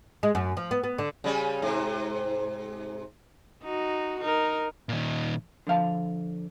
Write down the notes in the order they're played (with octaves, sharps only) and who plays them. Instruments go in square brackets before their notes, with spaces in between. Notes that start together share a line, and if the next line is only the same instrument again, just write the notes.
[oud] G#3
F#2
F3
B3
B3
D3
[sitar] C#3 G3 C#4
G#2 C3
[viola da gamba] D#4 F#4
D#4 A#4
[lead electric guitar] A#2 D#3
[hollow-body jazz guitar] D3 F3 F5 A5